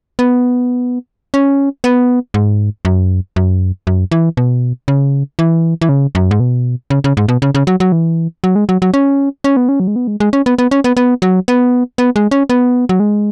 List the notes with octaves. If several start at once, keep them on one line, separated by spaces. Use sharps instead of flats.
B3
C#4
B3
G#2
F#2
F#2
F#2
E3
B2
C#3
E3
E3
C#3
F#2
G#2
B2
C#3
C#3
G#2
B2
C#3
C#3
F#3
F#3
E3
F#3
G#3
F#3
F#3
C#4
C#4
B3
C#4
F#3
G#3
B3
G#3
G#3
C#4
B3
B3
C#4
B3
B3
F#3
B3
B3
G#3
C#4
B3
F#3
G#3